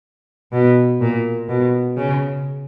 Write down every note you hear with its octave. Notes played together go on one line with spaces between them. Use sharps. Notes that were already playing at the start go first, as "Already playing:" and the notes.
B2
A#2
B2
C#3